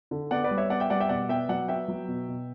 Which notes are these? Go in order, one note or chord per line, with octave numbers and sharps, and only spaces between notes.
D3
B3 D5 F#5
B4 D5
G3
C#5 E5
B3 D5 F#5
E5 G5
G3 D5 F#5
E5 G5
B2 D5 F#5
B3 E5 G5
F#3 D5 F#5
B3 E5 G5
F#3
B2
B2